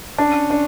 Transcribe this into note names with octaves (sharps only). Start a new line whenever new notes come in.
C#4 D4
D4